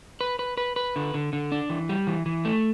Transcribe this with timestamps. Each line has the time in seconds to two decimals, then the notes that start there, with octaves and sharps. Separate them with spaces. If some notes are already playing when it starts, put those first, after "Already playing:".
0.21 B4
0.39 B4
0.57 B4
0.76 B4
0.96 D3
1.14 D3
1.33 D3
1.52 D4
1.70 E3
1.89 G3
2.07 E3
2.26 E3
2.45 A3